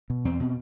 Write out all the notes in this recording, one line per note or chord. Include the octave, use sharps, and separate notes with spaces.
B2
E2 C4
B2